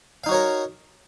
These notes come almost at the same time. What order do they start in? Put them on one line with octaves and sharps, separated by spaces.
F5 D#4 F#4 C#5 A#4